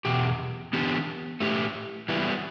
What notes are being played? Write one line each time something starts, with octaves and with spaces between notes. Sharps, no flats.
E2 B2 G4
E3 B3 D4 G4
A2 A3 G4
E3 G3 B3 E4